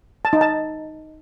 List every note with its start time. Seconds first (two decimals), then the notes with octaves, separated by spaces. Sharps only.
0.25 A5
0.33 D#4
0.41 A5